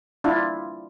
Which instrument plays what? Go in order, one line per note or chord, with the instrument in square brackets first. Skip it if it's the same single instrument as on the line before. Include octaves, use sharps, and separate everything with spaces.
[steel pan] D4 E4 F4